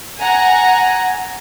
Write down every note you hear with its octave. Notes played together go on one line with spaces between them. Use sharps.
F#5 G#5 A#5